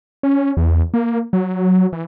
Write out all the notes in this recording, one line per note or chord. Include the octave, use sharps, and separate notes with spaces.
C#4
E2
A#3
F#3
E3